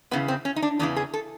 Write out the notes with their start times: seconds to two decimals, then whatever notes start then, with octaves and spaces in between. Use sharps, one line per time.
0.11 E2 C#3 E3 B3
0.28 C4
0.45 C#4
0.56 D#4
0.62 D4
0.79 E2 C#3 E3 D4
0.96 G#4
1.13 A4